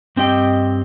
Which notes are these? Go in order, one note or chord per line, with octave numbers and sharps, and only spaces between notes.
G2 C4 G4 D#5 G5